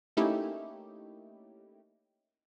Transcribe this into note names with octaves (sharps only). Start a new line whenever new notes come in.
A3 A#3 C#4 D#4 E4 G4